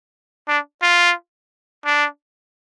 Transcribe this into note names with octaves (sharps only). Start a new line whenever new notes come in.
D4
F4
D4